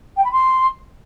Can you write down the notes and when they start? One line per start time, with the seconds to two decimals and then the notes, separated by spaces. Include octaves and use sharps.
0.16 G5
0.24 B5
0.31 C6